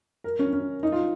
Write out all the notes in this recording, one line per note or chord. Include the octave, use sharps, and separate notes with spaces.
A#4
C#4
C#4
D#4
F4